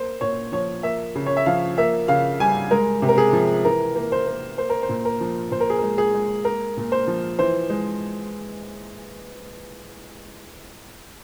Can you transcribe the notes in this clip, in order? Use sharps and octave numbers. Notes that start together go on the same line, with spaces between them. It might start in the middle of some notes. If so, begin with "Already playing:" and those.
Already playing: A#3 C5
A#2 C#5
F3 C#5
A#3 E5
C#3
C#5
E5
F3 F5
A#3 E5
C#3 F5
G3 G#5
G#3 A#4
C3
A#4
G#4
F3
E3 A#4
A#3
C5
A#3
A#3 C5
A#4
C5
A#2
A#4
F3
A#2 C5
A#4
G#4
G#3 A#4
G#4
G#3
A#3 A#4
A#2
C5
F3
E3 C5
G#3